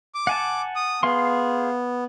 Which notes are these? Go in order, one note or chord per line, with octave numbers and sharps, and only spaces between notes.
D6
F#5 G#5 A5
D#6
B3 G#4 F5 C6